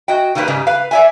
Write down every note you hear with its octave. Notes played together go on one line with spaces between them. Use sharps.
F#4 D#5 G5
D#3 G3 A#3 D4 B4
G#2 C#3 G3
B4 F5
D5 E5 G#5